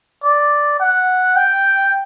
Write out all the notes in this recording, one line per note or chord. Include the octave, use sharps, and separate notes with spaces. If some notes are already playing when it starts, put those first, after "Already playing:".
D5
F#5
G5